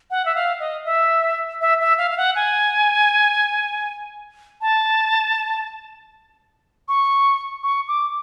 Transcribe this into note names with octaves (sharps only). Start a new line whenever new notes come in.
F#5
E5
F5
D#5
E5
E5
E5
F5
F5
F#5
G#5
A5
C#6
C#6
D6